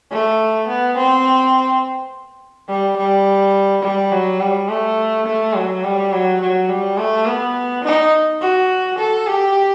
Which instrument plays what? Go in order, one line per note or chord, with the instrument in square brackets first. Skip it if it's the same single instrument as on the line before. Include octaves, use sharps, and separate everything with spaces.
[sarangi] A3
B3
C4
G3
G3
G3
F#3
G3
A3
A3
F#3
G3
F#3
F#3
G3
A3
B3
D#4
F#4
A4
G4